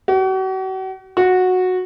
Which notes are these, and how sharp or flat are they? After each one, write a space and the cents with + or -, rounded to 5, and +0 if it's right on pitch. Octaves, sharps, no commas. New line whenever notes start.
F#4 +40
F#4 -10